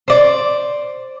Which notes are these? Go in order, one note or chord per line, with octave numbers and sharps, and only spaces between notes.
C5 D5